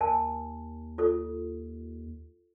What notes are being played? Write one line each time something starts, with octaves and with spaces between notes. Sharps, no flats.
D#2 A#4 G#5 A5
F4 A4